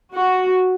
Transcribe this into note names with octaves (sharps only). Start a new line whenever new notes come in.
F#4